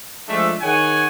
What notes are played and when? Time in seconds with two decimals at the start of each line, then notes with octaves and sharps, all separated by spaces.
0.28 F3 G#3 A3 D4 E5
0.62 D#3 G#4 C#5 F#5 G#5